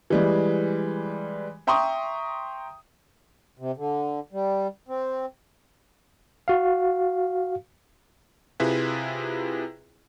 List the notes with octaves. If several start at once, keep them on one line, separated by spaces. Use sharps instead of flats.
E3 G3 G#3
E5 G5 A#5 C6 C#6 D#6
C3
D3
G3
C4
F#4 F5
C3 E4 F4 G#4 B4